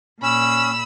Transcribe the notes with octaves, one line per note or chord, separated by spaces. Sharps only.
A#2 C#4 B5 E6